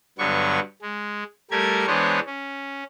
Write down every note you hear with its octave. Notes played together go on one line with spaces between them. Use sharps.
G2 D3 F#3 B3 C#6
G#3
G3 A3 G4 A#4 G#6
E3 G#3 B3 D4 C5 C#5
C#4